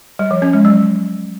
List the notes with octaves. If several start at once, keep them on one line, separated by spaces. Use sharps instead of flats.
G3
F3
C#4
G#3
F#3